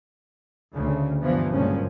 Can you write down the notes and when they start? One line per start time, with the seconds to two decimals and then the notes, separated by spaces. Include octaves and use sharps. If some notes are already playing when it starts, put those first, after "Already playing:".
0.73 D2 C#3
1.19 G2 E3 F3 B3
1.51 F#1 G2 A#2 F3 G#3 C#4